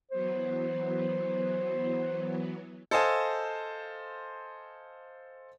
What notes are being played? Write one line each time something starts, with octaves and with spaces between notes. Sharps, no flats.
E3 F#3 B3 C5
A4 C5 D#5 F5 G#5 A5